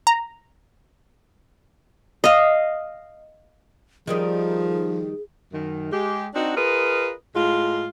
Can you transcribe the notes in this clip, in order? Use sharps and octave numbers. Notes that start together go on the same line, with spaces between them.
A#5
D#5 F5
D#3 F3 G3 D#4 G#4
F#2 D#3
G#3 G4
C4 D4 D#4 F#4
F4 G#4 A#4 B4 D#5
A2 G#3 F4